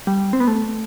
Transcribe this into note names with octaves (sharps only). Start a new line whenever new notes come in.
G3
C4
B3
A3